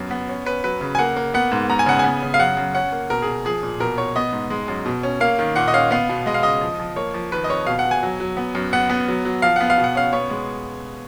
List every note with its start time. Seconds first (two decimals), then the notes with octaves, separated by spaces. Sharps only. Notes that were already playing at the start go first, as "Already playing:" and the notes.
Already playing: F#2 B3
0.11 B3
0.29 C#4
0.46 C#4 B4
0.64 F#3 B4
0.81 C#3
0.95 G#5
0.99 A#3 F#5
1.17 A#3
1.34 B3 F#5
1.52 G#2
1.70 B3 A#5
1.79 G#5
1.86 C#3 F#5
1.99 B3 G#5
2.23 C#3
2.34 F5
2.39 F#2 F#5
2.57 F#2
2.74 C#4 F#5
2.92 A#3
3.10 B2 A#4
3.22 B2 G#4
3.45 F3 G#4
3.63 A#2
3.80 B2 A#4
3.98 B2 C#5
4.16 B3 D#5
4.33 G#2
4.50 G#3
4.68 F#2
4.86 B2
5.03 C#4
5.20 A#3 F5
5.39 D#3
5.56 A#2 F#5
5.68 D#5
5.73 C#4 F5
5.91 B3 F5
6.09 B2
6.26 G#3 D#5
6.34 F5
6.43 C#3 D#5
6.61 F3
6.79 F3
6.96 A#3 C#5
7.14 F3
7.32 D#3 B4
7.44 D#5
7.49 F2 C#5
7.67 B2 F5
7.79 F#5
7.85 B2
7.91 G#5
8.03 F#3
8.20 F#3
8.37 B3
8.55 F#2
8.73 B3 F#5
8.90 B3
9.08 F#3
9.25 F#3
9.42 F3 F5
9.56 B3 F#5
9.70 F5
9.78 B2
9.84 F#5
9.95 C#4 F5
10.13 B3 C#5
10.31 G#3